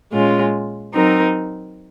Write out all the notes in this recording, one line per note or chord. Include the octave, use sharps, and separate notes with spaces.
A#2 G#3 C#4 F4
F#3 C4 D#4 A#4